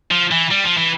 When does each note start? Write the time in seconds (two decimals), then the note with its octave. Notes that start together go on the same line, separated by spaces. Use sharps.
0.11 F3
0.31 E3
0.51 G3
0.64 F3
0.77 E3